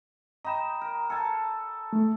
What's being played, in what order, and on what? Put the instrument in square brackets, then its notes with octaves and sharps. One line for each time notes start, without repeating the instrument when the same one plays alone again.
[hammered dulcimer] D#5 G5 [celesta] A#5 B5 E7
[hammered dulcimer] A#4
A4 G#5 A5
[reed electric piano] A3